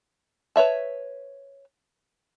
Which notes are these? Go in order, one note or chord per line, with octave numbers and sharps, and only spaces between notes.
B4 C#5 E5 A5